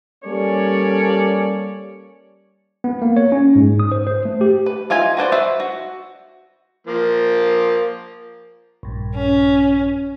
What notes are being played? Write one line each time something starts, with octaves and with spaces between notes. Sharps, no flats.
G3 A#3 C#4 A4 C#5 D5
B3
A#3
C#5
C#4
G#2
D#6
C5
C5
A3
G4
B4
D#4 F4 E5 G#5
F#4 B4 C5 D5
F#4 B4 C5 E5
F#4
F3 A#3
A#1 G2
C#4